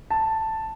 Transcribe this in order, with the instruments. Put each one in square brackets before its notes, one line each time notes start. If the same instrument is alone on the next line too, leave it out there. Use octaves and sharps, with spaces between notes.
[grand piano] A5